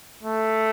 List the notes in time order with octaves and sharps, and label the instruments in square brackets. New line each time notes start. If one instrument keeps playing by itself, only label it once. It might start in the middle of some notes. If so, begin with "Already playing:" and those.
[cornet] A3